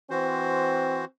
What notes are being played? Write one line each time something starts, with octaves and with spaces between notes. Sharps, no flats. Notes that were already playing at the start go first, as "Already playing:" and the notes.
E3 C4 F#4 C5